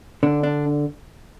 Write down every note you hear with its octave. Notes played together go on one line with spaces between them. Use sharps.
D3 D4
D4